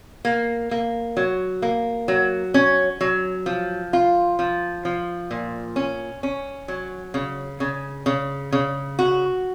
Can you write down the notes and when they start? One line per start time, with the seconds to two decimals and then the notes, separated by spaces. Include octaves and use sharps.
0.25 A#3
0.71 A#3
1.17 F#3
1.62 A#3
2.08 F#3
2.54 C#4
3.01 F#3
3.46 F3
3.93 F4
4.39 F3
4.85 F3
5.31 A#2
5.76 C#4
6.23 C#4
6.68 F#3
7.14 C#3
7.60 C#3
8.06 C#3
8.52 C#3
8.99 F#4